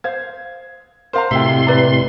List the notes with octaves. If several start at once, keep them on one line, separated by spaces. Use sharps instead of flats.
C5 F5 G#6
A#4 C5 F5 A#5 C6
F1 A2 C3 F#4 E5 G5 C6
B4 D5 A#5